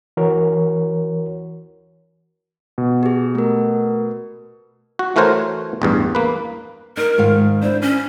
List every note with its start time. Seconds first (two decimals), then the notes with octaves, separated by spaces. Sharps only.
0.17 E3 F#4 A#4 C#5
2.78 B2
3.03 G4 G#4
3.35 A3 A#4
4.99 F#4
5.16 E3 A3 F#4 A#4 C5 C#5
5.82 A1 E2 G2
6.15 A#3 B4
6.97 D#4 A#4
7.18 G#2 D#3 F5
7.62 D4 E4 C5
7.82 C#4